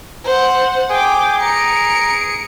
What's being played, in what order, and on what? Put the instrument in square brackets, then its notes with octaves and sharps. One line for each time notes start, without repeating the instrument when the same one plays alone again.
[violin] C5 F#5
[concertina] G#4 G#5 [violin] G5 D6
[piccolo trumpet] A#5 [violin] C#7 D7